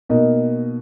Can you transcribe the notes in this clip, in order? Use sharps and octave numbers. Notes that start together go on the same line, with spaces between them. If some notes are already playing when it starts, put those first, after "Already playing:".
B2 A#3 D#4 A#4 D#5